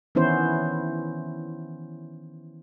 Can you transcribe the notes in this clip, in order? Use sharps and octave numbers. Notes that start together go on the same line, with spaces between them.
D#3 E3 B3 C#4 E4 C5